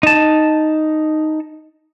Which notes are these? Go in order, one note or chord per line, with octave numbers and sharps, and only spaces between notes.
D#4 A5